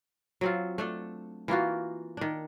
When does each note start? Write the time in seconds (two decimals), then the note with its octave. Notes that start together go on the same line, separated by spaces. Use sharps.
0.41 F#3 C4 F4
0.78 A3 D4 A4
1.48 E3 A#3 F4 F#4
2.17 D#3 D4